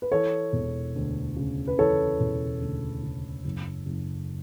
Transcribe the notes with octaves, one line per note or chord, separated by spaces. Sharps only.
B4
E3 A4 C#5
E1
D2
C#3
B4
E3 A4 C#5
E1
D2
C#3
F#1
F#1